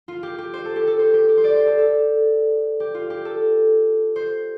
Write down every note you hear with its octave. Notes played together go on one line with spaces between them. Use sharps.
F4
G4
G4
C5
A4
G4
A4
C5
G4
G4
C5
D5
C5
A4
A4
G4
F4
G4
A4
C5